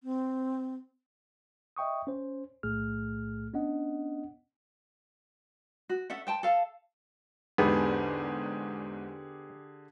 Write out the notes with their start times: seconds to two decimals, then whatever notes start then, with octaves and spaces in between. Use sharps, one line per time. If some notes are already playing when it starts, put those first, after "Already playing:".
0.03 C4
1.77 D#5 E5 G5 C#6 D#6
2.07 C#4 C5
2.63 B1 A2 A3 G#4 F6
3.54 B3 C#4 D4 D#5 F#5
5.89 F#4
6.10 C#4 A4 E5 F#5
6.27 C5 G5 A5
6.43 A4 F5 A5
7.58 E2 G#2 D3 B3 G4 G#4